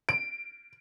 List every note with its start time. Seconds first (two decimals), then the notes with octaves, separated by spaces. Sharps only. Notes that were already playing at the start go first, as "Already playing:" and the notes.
0.09 D7